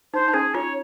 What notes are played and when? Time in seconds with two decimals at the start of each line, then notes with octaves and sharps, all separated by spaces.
0.14 D#4 C5
0.28 D#4
0.34 C#4 G#4
0.54 F4 C#5